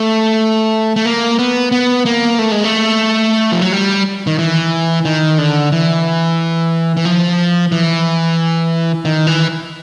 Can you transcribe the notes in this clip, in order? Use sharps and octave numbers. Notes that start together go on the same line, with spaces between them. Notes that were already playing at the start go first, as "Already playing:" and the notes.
Already playing: A3
A3
A#3
B3
B3
A#3
A3
G#3
A3
F3
F#3
G3
D#3
E3
D#3
D3
E3
E3
F3
E3
D#3
E3